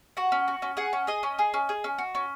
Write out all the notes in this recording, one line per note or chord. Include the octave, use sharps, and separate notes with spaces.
F#4 F#5
C#4
F#4
C#4
G#4 F#5
C#4
G#4 D#5
C#4
G#4
C#4
G#4
C#4
F#4
C#4